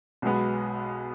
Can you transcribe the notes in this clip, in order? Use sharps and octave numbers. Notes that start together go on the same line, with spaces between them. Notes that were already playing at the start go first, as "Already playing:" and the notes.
B1 B2 G#3 B3